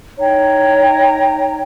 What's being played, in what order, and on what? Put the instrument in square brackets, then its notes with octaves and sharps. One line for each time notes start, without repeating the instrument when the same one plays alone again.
[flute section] D#4 C#5 G5 A#5